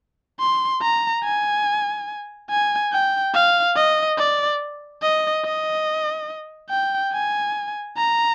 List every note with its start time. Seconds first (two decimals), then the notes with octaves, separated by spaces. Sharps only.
0.40 C6
0.82 A#5
1.23 G#5
2.50 G#5
2.92 G5
3.34 F5
3.76 D#5
4.18 D5
5.02 D#5
5.45 D#5
6.70 G5
7.13 G#5
7.97 A#5